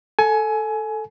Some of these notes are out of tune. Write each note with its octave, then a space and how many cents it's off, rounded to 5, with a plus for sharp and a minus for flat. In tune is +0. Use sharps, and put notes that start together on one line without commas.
A4 +0 G#5 +25